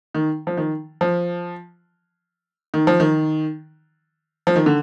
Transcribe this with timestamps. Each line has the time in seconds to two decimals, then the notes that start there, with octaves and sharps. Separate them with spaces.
0.15 D#3
0.47 F3
0.57 D#3
1.01 F3
2.74 D#3
2.87 F3
3.00 D#3
4.47 F3
4.56 D#3
4.66 D3